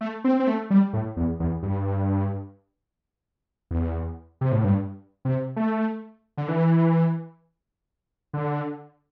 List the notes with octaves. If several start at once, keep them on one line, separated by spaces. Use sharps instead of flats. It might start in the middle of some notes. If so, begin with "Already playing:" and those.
A3
C4
C4
A3
G3
A2
E2
E2
G2
E2
C3
A2
G2
C3
A3
D3
E3
D3